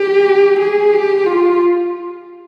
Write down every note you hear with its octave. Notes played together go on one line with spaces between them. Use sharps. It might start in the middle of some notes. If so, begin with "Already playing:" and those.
Already playing: G4
G#4
G4
F4